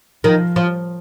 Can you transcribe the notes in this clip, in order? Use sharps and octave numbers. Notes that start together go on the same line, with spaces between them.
D#3 F3
F3